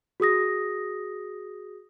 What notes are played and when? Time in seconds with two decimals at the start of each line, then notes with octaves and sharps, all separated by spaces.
0.20 F#4 G#4 D#6 A#6